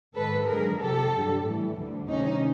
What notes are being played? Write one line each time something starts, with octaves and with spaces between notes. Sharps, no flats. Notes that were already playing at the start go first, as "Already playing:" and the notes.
G#2 D#3 G#3 A4 B4
F#2 D3 F3 G#3 G#4 A#4
F2 C3 F3 G4 A4
G2 D3 F#3
A2 E3 G3
D2 D3 G3
D2 C3 D#3 G3 C#4 D#4